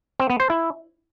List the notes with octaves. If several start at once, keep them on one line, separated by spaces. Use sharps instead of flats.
C4
B3
C5
E4